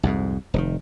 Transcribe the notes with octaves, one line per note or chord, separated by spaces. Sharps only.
C2 F2 G#2
F1 C3 D#3